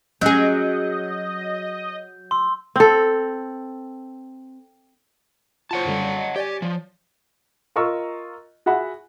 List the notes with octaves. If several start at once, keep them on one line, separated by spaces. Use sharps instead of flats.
F#3 C#4 G#4 D#5 G6
C6 E6
C4 A4
F4 C5 C#5 F#5 A5
F#2 D3 G3
D#5
G4 C#5 D5 G#5
F3
F4 A#4 D#5 A#5 C#6 E6
F#4 G#4 E5 F#5 B5